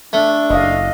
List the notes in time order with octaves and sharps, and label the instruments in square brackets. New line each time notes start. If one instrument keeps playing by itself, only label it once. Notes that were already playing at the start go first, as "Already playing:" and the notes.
[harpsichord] A3 [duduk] D4
[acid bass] F#1 [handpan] D#5 F5